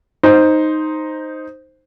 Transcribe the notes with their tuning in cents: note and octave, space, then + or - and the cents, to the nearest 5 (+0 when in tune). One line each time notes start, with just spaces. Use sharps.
D#4 +0 C5 +0